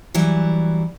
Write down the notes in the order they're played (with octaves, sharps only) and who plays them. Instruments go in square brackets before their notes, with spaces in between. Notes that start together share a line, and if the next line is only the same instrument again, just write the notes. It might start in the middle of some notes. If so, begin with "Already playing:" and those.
[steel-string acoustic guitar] E3 F#3 G3 E4